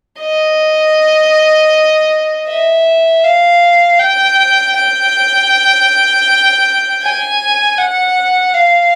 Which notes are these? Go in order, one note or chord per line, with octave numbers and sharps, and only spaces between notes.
D#5
E5
F5
G5
G5
G#5
F#5
F5